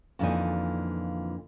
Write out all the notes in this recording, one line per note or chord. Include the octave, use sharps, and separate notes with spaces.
F2 A#2 D3 E3 D#4 G#5